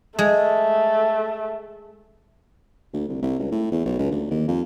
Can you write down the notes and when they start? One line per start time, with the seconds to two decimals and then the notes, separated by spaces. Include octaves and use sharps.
0.19 G#3 A3
2.93 D2
3.09 C2
3.22 C2
3.39 C#2
3.51 A2
3.72 E2
3.86 B1
3.99 C#2
4.11 D2
4.31 D#2
4.48 F2